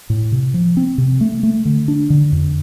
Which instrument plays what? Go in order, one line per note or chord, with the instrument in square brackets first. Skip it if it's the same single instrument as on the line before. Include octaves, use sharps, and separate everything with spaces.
[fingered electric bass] A2
C3
F3
C4
C3
A3
A3
D3
D4
D3
F2